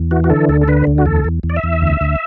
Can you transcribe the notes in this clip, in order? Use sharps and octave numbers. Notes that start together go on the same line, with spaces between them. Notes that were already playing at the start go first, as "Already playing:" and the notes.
Already playing: E2
E3 F#4
F#4
D3 A4
D2 A4
A4
D3 B4
D2
F#4
E2 A4
E2
E2
D5
E5
E2
D2
D2